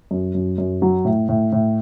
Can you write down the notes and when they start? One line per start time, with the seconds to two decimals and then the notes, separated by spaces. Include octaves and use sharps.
0.11 F#2
0.35 F#2
0.58 F#2
0.82 F#3
1.05 A2
1.29 A2
1.52 A2